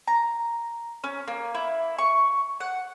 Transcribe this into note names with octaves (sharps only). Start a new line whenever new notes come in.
A#5
C#4
A#3
E4
C#6
F#5